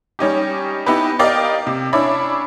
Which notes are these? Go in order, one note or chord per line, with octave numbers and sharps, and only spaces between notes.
G3 C#4 D#4 G4
B3 D#4 E4 G4 B4
G4 A#4 D5 D#5 F5 G5
C3
C#4 D4 E4 B5